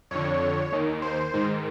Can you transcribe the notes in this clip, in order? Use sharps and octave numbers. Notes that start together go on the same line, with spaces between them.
F2 D3 C#5
D#2 D#3
C5
G#2 D#3